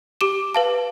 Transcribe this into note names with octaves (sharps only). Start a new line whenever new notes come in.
G4 D6 E7
B4 F5 A5